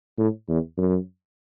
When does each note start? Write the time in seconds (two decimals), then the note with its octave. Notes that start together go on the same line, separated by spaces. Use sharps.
0.18 A2
0.49 E2
0.78 F#2